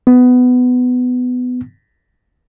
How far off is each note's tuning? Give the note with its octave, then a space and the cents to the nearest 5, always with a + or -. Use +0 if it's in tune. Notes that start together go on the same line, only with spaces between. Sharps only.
B3 +15